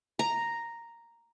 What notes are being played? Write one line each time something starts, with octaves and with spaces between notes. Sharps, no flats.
A#5